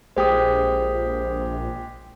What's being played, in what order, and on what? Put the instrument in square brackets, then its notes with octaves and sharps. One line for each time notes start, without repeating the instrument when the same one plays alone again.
[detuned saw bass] A#1 [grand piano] G#3 G4 [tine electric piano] C5 D#6